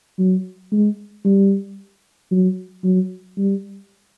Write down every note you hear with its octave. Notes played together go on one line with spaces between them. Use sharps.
F#3
G#3
G3
F#3
F#3
G3